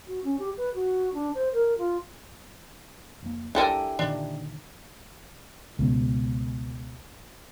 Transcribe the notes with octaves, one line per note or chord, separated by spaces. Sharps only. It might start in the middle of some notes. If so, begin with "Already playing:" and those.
F#4
C#4
G4
B4
F#4
D4
C5
A#4
F4
F1 A#3
C2 D4 E4 G4 A4 A#4 G#5
A#2 D3 D#3 D4
C#2 B2